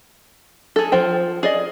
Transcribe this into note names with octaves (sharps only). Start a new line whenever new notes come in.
G#4 A4
F3 C5 G5
G#4 D5 D#5